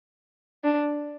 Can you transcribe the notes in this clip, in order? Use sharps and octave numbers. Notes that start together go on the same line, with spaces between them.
D4